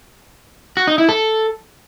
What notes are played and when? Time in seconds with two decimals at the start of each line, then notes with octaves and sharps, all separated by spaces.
0.77 F#4
0.87 D#4
0.98 E4
1.09 A4